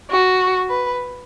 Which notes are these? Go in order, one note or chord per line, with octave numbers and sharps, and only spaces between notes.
F#4
B4